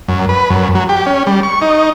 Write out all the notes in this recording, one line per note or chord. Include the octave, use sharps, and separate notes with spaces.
F#2
B4
F#2
F#3
G4
C#4
G3
C#6
D#4